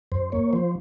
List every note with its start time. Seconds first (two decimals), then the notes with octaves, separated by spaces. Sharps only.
0.12 F#2 C5
0.32 A#3 C#5
0.53 F3 C5